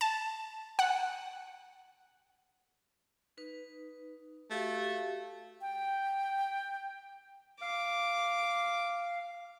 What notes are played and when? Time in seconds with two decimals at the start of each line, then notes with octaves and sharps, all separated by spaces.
0.01 A5
0.79 F#5
3.37 D#4 B4
4.51 A3 F#4 G4 F5
5.61 G5
7.61 F5 D6